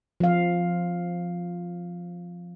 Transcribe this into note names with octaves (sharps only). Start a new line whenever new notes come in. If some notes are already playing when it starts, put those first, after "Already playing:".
F3 F5